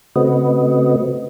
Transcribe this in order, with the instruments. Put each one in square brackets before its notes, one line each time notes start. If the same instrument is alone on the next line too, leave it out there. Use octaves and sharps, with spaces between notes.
[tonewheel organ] C#3 A3 C4 F#4 B4 D#5